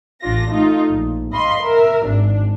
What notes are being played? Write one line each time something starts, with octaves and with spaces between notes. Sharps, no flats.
A1 D4 F4 A#6
A3 D#4 F4
A#1
D#5 F5 B5 C6
A#4 E5
G#1 D4